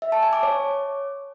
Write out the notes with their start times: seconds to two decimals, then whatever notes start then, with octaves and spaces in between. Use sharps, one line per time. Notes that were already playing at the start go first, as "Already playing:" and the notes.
0.02 E5
0.12 A5
0.22 G#5
0.33 D6
0.43 C#5